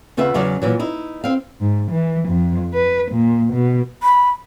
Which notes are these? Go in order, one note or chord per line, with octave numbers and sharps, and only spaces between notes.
D#2 C#3 F4 B4 E5 F#5
E2 C#3 F#3 D5
A#2 E3 F#3
D#4 E4
C4 F5
G#2
E3
F2
B4
A#2
B2
B5